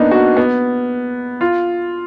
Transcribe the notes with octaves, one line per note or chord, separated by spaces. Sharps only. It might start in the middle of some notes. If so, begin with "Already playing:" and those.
Already playing: A#3 B3 D4 D#4
F#4
B3
F4